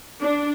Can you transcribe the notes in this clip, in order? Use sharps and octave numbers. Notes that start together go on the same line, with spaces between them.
D4